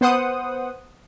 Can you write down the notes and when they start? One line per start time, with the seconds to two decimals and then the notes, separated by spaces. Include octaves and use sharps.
0.01 B3 C5 F#5 D#6